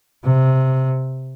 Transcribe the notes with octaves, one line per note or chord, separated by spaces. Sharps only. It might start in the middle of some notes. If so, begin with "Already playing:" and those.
C3